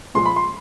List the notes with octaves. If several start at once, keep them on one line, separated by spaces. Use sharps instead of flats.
A#2 F3 G#3 C6
B5
C6